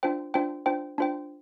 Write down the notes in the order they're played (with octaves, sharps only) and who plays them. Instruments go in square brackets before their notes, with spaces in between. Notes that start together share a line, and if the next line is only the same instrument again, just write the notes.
[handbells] D4 F4 C5 G5
D4 F4 C5 G5
D4 F4 C5 G5
D4 F4 C5 G5